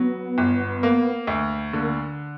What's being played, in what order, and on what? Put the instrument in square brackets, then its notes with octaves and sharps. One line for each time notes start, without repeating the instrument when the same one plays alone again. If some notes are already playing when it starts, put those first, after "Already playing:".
Already playing: [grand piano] F#3 [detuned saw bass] B3
[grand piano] G1
A#3
D2
[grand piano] D3 [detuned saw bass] A#3